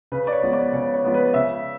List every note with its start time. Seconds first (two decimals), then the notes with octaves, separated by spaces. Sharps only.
0.12 C#3 B4
0.27 D5
0.32 C#5
0.43 F3 G#3 B3
0.53 D5
0.73 C#3 C#5
0.94 C#5
1.04 F3 G#3 B3
1.14 B4
1.34 C#3 E5